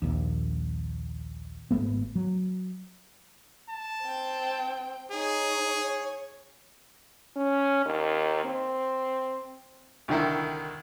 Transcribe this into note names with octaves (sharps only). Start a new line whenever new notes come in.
A#1 D#2
G#1 G2 A3 B3
F#3
A5
C4 G5
D#4 G#4 C#5
C#5
C#4
D#2
C4
C2 D3 D#3 E4